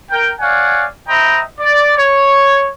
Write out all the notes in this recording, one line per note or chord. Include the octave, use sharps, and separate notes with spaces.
A#4 G5
C#5 D5 F5 F#5 G#5
C5 D#5 E5 G5 A#5 B5
D5
C#5